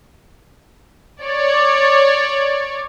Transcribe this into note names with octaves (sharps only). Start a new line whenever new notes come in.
C#5 D5